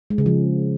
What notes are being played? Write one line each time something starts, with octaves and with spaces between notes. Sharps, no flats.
G#3
C#3
F3